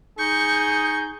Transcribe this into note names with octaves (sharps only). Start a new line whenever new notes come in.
D#4 G#4 C#6 G6